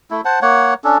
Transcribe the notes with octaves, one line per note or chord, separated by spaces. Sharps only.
A3 E4
C5 F#5 A5
A#3 C#5 F#5
C#4 D4 A4